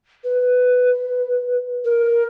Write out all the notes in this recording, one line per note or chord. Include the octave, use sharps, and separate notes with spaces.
B4
A#4